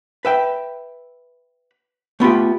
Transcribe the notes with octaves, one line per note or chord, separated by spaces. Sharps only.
B4 E5 G5
A3 B3 F4 G4